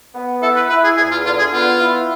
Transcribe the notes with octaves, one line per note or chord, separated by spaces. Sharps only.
B3
E4 A4
B4
E4 B4
G#4
E2 G#4
F4
D3 F4
G#4
B3 F4
E4